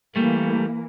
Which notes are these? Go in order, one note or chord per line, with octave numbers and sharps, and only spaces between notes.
E3 G3 A3 A#3